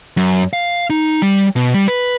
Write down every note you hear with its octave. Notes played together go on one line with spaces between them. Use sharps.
F#2
F5
D#4
G3
B2
G3
B4